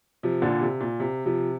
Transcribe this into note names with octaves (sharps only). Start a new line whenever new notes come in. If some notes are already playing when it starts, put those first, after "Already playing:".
C3 F3
A#2 D3
C3
A#2
C3
C3 F3